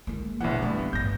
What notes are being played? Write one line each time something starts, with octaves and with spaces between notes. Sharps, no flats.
G#3 A#3
A#1 E2 B2 E3 F#5
G2 A3 B3 C4
C#4
A1 G2 G6 A#6